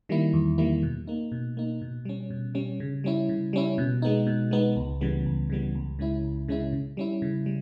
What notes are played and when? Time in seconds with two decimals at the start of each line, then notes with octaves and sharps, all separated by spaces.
0.09 D#3 G3 A#3 E4
0.33 E2
0.58 D#3 G3 A#3 E4
0.83 B2
1.07 A#3 D#4
1.32 B2
1.57 A#3 D#4
1.82 B2
2.05 G3 C#4
2.30 B2
2.55 G3 C#4
2.80 C#3
3.04 G3 C#4 E4
3.29 C#3
3.53 G3 C#4 E4
3.78 B2
4.02 G#3 B3 D#4
4.27 B2
4.51 G#3 B3 D#4
4.76 C#2
5.01 C#3 E3 G3 B3
5.26 C#2
5.50 C#3 E3 G3 B3
5.75 C#2
5.99 C#3 G#3 C#4 E4
6.24 C#2
6.48 C#3 G#3 C#4 E4
6.72 C#3
6.97 G3 C#4 E4
7.22 C#3
7.46 G3